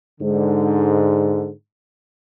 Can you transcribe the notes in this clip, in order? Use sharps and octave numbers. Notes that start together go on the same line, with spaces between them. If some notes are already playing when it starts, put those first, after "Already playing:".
G#2 D3